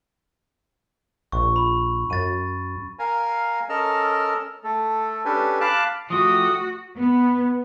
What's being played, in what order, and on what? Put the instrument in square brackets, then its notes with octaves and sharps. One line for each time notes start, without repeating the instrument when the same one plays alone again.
[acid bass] A#1 [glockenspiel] C#6
[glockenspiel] B5
[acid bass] F#2 [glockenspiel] A6 D#7
[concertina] A#4 F5 G#5 A#5
C#4 A4 A#4 D#5 E6 F6
A3 A4
C#4 D4 G4 A4 B4 G#5
F5 A5 B5 D6 F#6
[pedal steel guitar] F3 A3 G4 [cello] F#4 [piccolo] D#6
[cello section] B3